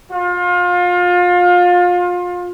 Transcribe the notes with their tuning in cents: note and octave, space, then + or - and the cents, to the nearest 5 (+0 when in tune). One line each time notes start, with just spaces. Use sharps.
F4 +30